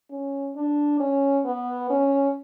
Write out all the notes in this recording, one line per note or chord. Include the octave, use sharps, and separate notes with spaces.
C#4
D4
C#4
B3
C#4